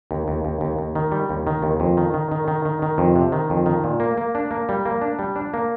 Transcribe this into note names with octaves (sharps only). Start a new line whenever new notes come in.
D#2
D#2
D#2
D#2
D#2
D#3
G3
D#2
D#3
D#2
F2
D#3
D#3
D#3
D#3
D#3
D#3
F2
C3
D#3
F2
D#3
A#2
A#3
A#3
D4
A#3
G3
A#3
D4
G3
D4
A#3